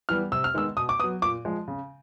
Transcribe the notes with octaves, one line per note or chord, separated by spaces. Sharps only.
E3 G3 B3 F6
C3 E6
F6
D#3 G#3 B3 E6
B2 D#6
D6
F#3 B3 D#6
A#2 D6
F3 G#3
C#3